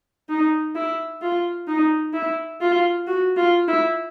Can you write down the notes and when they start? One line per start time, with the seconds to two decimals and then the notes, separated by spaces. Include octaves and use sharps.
0.29 D#4
0.75 E4
1.22 F4
1.68 D#4
2.13 E4
2.61 F4
3.07 F#4
3.37 F4
3.68 E4